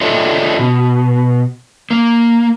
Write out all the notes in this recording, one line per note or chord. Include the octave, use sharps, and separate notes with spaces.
D4 F4 A4 C#5 D#5 E5
B2
A#3